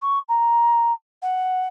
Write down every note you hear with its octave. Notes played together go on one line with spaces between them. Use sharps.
C#6
A#5
F#5